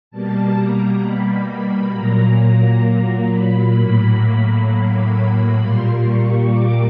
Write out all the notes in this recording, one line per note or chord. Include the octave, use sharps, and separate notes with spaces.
B2 G3 A#3 A5
A#5
B5
B5
A#2 F#3 A#3 A#5
A#5
A#5
B5
A2 F#3 A#3
B5
A#2 G3 A#3 C6
C#6
D6